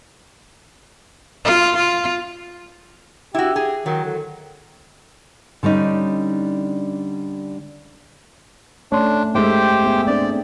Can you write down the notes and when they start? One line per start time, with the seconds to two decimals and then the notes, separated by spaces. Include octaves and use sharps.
1.44 F4
1.76 F4
3.34 E4 F#4 G4
3.56 G#4
3.86 D#3 F#3
4.05 D3
5.63 D3 G3 C#4 D#4
8.92 A3 C#4 D4 C#5 C6
9.35 G2 G#3 A3 D#4 G4 C5 E5 G5
9.84 B3 G#4 E5
10.07 C4 D4 C5 D5